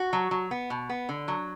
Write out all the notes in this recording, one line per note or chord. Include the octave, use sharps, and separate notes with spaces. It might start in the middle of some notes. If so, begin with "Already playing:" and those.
Already playing: F#4
F#3
F#3
B3
B2
B3
D3
F#3